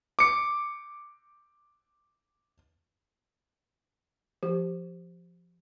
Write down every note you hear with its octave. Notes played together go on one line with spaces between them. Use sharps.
D6 C#7
F3 G4